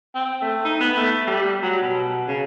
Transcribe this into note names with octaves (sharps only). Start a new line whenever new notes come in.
C4
A3
D#4
B3
A3
G3
F#3
B2
C#3